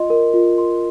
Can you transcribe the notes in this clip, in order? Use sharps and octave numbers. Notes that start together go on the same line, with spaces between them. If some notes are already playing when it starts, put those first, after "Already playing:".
Already playing: F4 D#5 C6
A#4
F4
C6